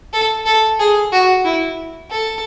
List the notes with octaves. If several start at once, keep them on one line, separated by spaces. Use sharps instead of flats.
A4
A4
G#4
F#4
E4
A4